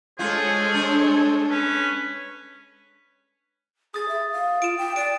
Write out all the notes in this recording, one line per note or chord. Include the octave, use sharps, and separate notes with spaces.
G#3 F4 G#4 A4 C5 C#5
D4
C#4 B4
G#4 D#6 A6
E5
F5
F4 D7 E7
G5
D5 D7